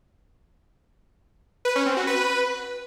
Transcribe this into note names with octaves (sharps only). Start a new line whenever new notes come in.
B4
C#4
C4
F#4
B4